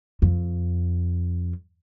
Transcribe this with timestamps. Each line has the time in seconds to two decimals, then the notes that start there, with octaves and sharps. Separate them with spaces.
0.22 F2